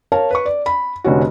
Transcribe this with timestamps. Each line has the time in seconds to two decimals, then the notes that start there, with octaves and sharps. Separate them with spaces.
0.12 A#4 C#5 F5 A5
0.31 B4 C#6
0.46 D5
0.66 B5
1.04 F1 D3 C#4 F#4